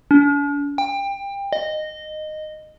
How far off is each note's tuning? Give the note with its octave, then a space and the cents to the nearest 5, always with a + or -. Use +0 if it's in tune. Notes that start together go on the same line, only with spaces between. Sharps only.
D4 -45
G5 +25
D#5 -15